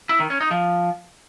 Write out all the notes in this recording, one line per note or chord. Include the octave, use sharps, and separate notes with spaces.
E4
D#3
C#4
D#4
F3